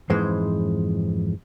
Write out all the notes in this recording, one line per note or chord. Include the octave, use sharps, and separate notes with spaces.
F2 G#2 E3 G#3 C5